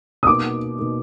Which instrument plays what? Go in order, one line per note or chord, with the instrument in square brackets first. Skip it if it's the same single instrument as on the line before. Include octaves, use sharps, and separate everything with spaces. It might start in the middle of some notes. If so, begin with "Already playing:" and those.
[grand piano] D#6
[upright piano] B2 A#3 D#4 [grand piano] D6
[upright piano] B2 A#3 D#4